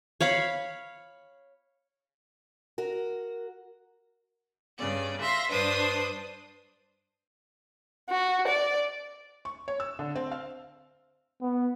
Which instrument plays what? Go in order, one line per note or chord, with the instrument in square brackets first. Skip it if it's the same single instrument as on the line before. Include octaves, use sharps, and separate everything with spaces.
[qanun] C#5 F5 B5
[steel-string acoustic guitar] F#4 A#4
[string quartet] G2 C#3 D5
E5 F5 C6 A#6
G2 D4 B4 C5 D#6
[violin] F#4
D5
[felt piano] C#6
C#5
E6
D3
C4
F5
[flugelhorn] B3